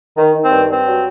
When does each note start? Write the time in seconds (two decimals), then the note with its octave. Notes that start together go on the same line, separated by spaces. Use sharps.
0.17 D#3
0.34 D#3
0.43 C4
0.51 G2
0.68 G2 C4
0.85 F#3